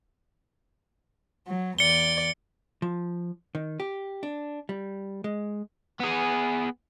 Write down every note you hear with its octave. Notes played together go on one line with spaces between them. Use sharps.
F#3
E2 D5 C#7 G7
F3
D#3
G4
D4
G3
G#3
B3 G#4